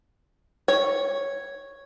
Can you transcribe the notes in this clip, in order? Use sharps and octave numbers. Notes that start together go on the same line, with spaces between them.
C#5